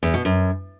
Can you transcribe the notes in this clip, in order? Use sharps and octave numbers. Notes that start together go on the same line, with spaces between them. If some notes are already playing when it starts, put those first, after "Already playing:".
E2
B2
F#2